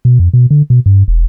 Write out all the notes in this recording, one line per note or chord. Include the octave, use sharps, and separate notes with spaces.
B2
F2
B2
D3
B2
G2
E1